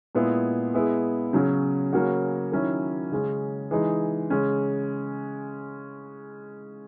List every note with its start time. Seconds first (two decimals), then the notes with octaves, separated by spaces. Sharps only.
0.15 A#2 G#3 B3 E4 G#4
0.74 G#3 B3 E4 G#4
1.33 C#3 F#3 C#4 F#4
1.93 C#3 F#3 A#3 C#4 F#4
2.52 D#3 F#3 C#4 E4
3.12 C#3 G#3 C#4
3.71 E3 G#3 D#4 G#4
4.30 C#3 G#3 C#4